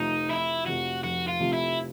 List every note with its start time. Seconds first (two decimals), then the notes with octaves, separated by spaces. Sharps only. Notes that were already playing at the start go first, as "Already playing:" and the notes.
Already playing: F1 F2 C3 F3 A3 D#4
0.29 F1 E4
0.66 F2 C3 F3 A3 F#4
1.04 F1 F#4
1.28 F4
1.40 F2 C3 F3 A3
1.53 E4